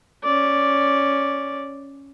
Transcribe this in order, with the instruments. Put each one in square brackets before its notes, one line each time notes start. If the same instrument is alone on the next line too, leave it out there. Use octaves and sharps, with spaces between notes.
[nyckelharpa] C#4 D5